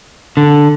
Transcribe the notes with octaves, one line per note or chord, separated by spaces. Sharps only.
D3